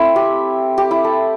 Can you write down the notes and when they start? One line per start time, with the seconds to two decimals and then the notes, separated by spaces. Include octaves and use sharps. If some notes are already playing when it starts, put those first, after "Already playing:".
Already playing: A3 C4 E4
0.16 G4
0.78 G4
0.91 E4
1.04 A4